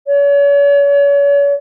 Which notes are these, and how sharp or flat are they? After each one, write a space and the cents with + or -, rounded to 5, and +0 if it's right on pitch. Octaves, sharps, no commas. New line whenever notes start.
C#5 +40